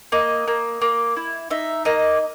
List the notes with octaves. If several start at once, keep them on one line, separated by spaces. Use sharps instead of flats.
A#3 D#5
A#3
A#3
E4
D#4 E5
A#3 D#5